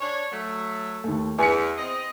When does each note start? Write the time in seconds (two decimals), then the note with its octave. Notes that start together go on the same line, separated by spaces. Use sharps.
0.01 D4 C#5
0.31 F#3 A3
1.04 D#2 A3
1.39 E2 G#5 C#7
1.77 C4 D#5